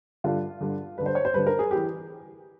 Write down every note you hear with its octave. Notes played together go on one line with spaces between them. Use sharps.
G2 D3 F4
G2 D3
G2 D3 B4
C5
C#5
C5
G2 D3 B4
A#4
G#4
E3 G4